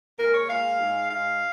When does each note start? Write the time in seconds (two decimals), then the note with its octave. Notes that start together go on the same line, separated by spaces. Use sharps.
0.19 A#2 G#3 A#4
0.34 C#5
0.49 A#2 G#3 F5
0.80 G#2 G#3
1.09 G#2 G#3 F5